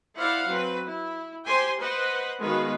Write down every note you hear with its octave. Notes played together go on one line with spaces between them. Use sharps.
E4 C5 D5 F5 F#5
F#3 C4 B4
E4
G4 C5 G5 G#5 C6
B4 C5 D#5 F#5
D#3 G#3 B3 F#4 B4 F5